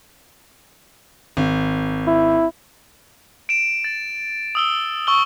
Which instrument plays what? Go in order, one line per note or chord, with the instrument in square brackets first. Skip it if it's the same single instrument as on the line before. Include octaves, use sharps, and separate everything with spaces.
[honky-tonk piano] G#1
[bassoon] E4
[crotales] D7 E7
A6
D#6 E6 G7
C#6 E6 G7